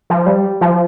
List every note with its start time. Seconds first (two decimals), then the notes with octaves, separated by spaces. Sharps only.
0.10 F3
0.26 G3
0.61 F3